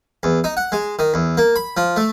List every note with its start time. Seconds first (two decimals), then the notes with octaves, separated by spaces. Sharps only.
0.23 E2
0.44 D#4
0.57 F#5
0.72 G#3
0.99 D#3
1.14 E2
1.38 A#3
1.56 B5
1.77 F3
1.96 A3